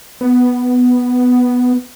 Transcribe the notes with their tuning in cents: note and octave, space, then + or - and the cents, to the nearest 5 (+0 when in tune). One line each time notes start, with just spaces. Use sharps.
B3 +5